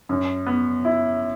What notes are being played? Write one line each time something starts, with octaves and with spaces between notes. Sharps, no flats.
F#2
B3
E4